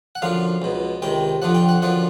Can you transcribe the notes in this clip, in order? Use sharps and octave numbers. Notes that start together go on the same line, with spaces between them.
F#5
F#2 D3 F3 F5
C#2 B2
C#2 C3 D#3 G5
F2 D3 F3 F#5
G5
F#5
F#2 D3 F3 F#5